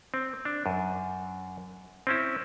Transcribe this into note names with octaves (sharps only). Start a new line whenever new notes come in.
C4
D4
F#2
C4 C#4 E4